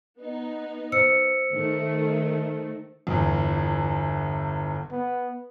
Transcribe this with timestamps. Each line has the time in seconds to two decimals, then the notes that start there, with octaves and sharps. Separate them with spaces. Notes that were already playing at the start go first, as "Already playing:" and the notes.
0.19 B3 D#4
0.92 C5 E6 C#7
1.51 D#3 A3
3.07 G1 E2
4.92 B3